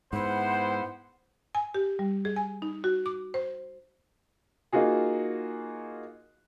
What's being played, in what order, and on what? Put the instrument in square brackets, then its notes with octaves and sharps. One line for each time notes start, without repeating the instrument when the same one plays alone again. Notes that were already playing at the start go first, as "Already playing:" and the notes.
[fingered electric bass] G#2 [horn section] B3 E4 C5 [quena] F#5
[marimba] G#5
G4
G3
G#4
G#5
D#4
F#4
D6
C5
[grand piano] A#3 D#4 F4 F#4 G#4